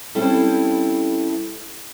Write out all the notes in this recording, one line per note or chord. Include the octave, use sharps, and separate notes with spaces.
G3 C4 C#4 E4 A4